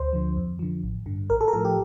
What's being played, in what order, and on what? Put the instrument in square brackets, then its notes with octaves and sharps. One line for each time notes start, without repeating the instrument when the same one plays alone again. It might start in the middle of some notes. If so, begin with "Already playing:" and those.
Already playing: [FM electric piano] D2 C5
D3 F3
F2
D3 F3
A1
G2 D3
A1 A#4
A4
A#4
A2 F3 A4
G4